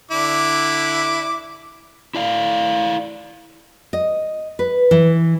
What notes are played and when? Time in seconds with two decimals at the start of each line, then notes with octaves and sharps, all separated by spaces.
0.11 D3 E4 D6
2.15 E4 D5 F5
3.93 D#5
4.59 B4
4.91 E3